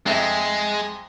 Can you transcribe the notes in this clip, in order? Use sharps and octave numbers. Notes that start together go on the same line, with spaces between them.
F2 G#3 E5